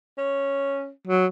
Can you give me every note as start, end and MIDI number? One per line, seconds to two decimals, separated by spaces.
0.18 0.90 61
1.07 1.27 54